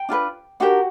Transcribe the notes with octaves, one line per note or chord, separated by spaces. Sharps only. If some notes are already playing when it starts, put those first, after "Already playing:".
Already playing: G5
D4 F4 G#4 B4
D4 F#4 G4 A#4 F#5